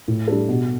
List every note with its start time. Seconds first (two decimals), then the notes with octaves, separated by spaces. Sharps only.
0.08 A2
0.28 G3 D4 A4
0.49 B2